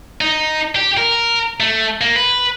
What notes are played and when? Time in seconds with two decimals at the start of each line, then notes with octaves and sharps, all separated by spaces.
0.21 D#4
0.76 G4
0.98 A#4
1.60 A3
2.01 A#3
2.16 B4